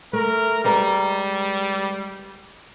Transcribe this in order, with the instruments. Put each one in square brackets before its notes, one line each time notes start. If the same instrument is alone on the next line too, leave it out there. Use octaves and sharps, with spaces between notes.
[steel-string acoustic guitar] A3 [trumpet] A#4
[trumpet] G3 [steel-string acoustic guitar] G#3 B4 A#5